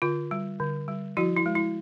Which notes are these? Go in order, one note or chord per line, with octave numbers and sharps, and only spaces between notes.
D3 F4
G3
D3
G3
F3 E4 F#4
E4
G#3
E4